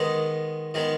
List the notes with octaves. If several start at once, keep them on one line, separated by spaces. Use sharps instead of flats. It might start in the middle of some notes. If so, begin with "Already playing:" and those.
Already playing: D#3 G#3 B3 D#5
D#3 G#3 B3